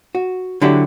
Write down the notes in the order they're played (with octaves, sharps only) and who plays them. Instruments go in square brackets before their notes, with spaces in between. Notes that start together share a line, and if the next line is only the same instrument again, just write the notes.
[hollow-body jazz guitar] F#4
D3 F#3 D4 E4 G4